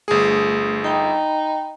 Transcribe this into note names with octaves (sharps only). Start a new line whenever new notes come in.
G1 A3 G#4
D#4 G5 B5